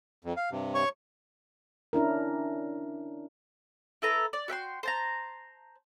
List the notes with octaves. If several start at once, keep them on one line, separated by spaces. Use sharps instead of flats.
F2
F5
G2 C3
C#5 C#6
C#4 D4 E4 A#4
E4 A4 B4 A#5
D5
F#4 E5 G5 C6
C5 A5 A#5